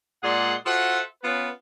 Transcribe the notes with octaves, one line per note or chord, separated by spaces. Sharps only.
A#2 G#3 G#4 D5 F#5 C6
F4 F#4 A4 C5 E5 F#5
B3 C#4 F4 B4